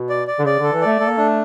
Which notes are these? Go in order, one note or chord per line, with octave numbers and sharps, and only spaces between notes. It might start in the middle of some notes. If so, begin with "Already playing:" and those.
Already playing: B2
D5
D5
D3
C#3 D5
D3 A4
E3
A3 D5
A3 A4
A#3
A3 D4